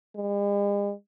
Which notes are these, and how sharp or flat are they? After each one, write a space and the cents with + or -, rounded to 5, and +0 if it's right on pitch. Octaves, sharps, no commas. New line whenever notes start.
G#3 -45